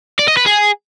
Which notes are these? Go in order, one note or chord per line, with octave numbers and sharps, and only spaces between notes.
D5
D#5
B4
G#4